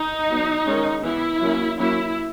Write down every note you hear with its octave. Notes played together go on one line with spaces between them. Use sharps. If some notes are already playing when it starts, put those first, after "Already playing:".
Already playing: D#4
F#3 B3
D#3 G#3 C#4
E3 B3 E4
F#3 A#3 C#4
F#3 A#3 C#4 E4